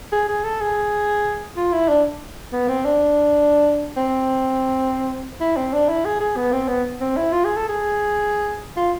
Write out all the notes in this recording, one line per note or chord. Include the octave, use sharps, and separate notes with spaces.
G#4
G#4
A4
G#4
F4
E4
D4
B3
C4
D4
C4
E4
C4
D4
E4
G#4
G#4
B3
C4
B3
C4
E4
F4
G#4
A4
G#4
F4